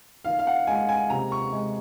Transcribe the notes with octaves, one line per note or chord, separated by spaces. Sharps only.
D#3 F5
F5
F#5
G#3 G#5
G#5
C3 A#5
C#6
G#3